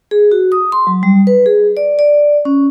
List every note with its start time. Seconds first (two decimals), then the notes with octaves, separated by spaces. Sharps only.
0.11 G#4
0.32 F#4
0.52 D#6
0.72 C6
0.87 F#3
1.03 G3
1.27 B4
1.46 G#4
1.77 D5
1.99 D5
2.45 C#4